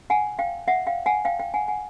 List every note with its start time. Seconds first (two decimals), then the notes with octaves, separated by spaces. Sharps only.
0.10 F#5 G#5
0.39 F5 G5
0.68 E5 F#5
0.87 F5 G5
1.06 F#5 G#5
1.25 F5 G5
1.40 F5 G5
1.54 F#5 G#5
1.68 F#5 G#5